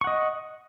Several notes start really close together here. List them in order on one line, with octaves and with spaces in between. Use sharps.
C#6 F#5 D#5